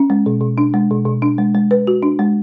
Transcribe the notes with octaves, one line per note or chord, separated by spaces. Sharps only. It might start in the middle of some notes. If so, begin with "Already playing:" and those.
Already playing: C#4
G#3
B2
B2
D4
G#3
B2
B2
D4
G#3
G#3
B4
F#4
D4
G#3